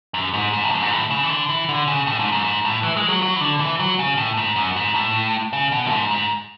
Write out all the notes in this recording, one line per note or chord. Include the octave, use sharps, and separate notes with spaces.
F#2
G#2
G#2
A2
F#2
G#2
A2
C#3
E3
D3
E3
D3
C#3
A2
G#2
F#2
G#2
A2
E3
G#3
F#3
F#3
E3
D3
E3
F#3
C#3
A2
G#2
F#2
G#2
A2
C#3
B2
F#2
G#2
G#2